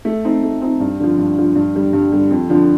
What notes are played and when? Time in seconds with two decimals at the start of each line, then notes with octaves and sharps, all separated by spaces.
0.05 A3
0.25 C4 D#4
0.43 A3
0.62 C4 D#4
0.80 G2
1.00 D3 F3
1.18 G2
1.38 D3 F3
1.55 G2
1.75 D3 G3
1.93 G2
2.12 D3 G3
2.31 F2
2.50 D3 F3